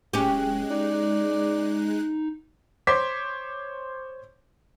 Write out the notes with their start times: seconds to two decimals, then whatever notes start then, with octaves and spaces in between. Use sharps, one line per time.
0.13 D1 G#3 C#4 G4 F#6
0.70 D#4 D5
2.87 C5 C#5 C6 D6 B6